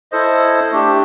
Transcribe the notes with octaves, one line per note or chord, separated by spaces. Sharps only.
E4 A4 C5 D#5
A3 D4 G4